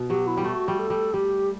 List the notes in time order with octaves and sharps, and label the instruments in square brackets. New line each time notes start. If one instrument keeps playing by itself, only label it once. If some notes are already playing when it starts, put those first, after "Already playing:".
Already playing: [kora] B2
[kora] F#3 [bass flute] G4
[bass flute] E4
[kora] G3
[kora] A3 [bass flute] F#4
[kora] G3
[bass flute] A4
[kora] G3
[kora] G3 [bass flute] G4